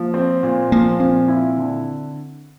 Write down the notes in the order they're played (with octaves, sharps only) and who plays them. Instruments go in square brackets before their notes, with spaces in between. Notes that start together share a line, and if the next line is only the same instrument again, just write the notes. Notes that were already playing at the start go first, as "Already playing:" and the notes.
Already playing: [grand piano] F3 [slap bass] A#3
[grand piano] C4
A#2
[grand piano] F3 [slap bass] A#3
[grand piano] A#2 [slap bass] C4
[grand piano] E4
D3